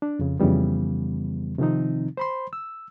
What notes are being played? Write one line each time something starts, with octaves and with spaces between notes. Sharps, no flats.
D4
F2 C#3
F2 C#3 E3 G3 B3
C3 D#3 F3 C4 D#4
C5 B5 C6
E6